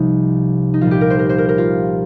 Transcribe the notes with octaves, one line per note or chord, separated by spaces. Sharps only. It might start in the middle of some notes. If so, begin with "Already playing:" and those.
Already playing: C2 C3 F3 D#4
D#4
C2 A#2 F3 F4
G4
A#4
C5
A#4
C5
A#4
A#4
F4